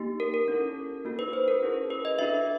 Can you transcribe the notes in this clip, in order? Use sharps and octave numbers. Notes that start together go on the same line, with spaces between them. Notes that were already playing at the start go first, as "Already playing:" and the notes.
Already playing: A#3 D#4 G4
A#4
A#4
C#4 E4 A4
A#3 D#4 F#4 A4
B4
C5
A#4
C#4 E4 G#4
B4
D#5
D4 F#4 A4 E5
B4